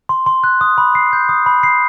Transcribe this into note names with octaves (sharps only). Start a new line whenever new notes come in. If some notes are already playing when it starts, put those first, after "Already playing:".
C6
C6
F#6
D#6
B5
C7
G6
D#6
B5
C7